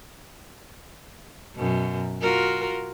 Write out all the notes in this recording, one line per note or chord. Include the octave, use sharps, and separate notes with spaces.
F#2 B2
F4 F#4 A#4